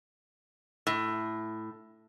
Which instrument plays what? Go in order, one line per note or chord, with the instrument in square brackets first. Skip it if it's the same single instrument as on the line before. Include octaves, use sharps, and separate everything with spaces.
[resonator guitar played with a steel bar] A2